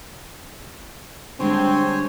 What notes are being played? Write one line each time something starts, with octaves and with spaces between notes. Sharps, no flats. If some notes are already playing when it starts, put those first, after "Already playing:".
D3 G3 G#3 C4 D4 C5 C#5 G#5